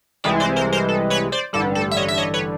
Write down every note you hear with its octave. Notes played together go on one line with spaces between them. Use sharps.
C2 C3 E3 G#3 D5 E5
C5 D5
A#4 C5
A#4 C5
A4
B4 C#5
C5 D5
A1 G2 D3 G3 A4
A4
E5
C#5 D#5
E5
C#5 D#5
B4 C#5